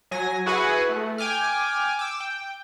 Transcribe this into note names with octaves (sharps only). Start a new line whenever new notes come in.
F#3 G#5 A#6
E4 F#4 G#4 B4 F#5 G#5
A3
G5 G#5 D6 F6
D6 E6
G5